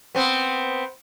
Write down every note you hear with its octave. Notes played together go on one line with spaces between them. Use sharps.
B3 C4